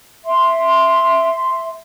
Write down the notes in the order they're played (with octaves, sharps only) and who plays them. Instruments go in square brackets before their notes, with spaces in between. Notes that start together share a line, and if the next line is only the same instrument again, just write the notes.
[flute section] E5 C6